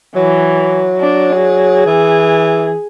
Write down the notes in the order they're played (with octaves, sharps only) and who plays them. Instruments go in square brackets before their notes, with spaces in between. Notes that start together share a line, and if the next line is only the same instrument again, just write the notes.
[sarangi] E3 [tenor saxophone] F#3
[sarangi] D4
G#4
[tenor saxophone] E3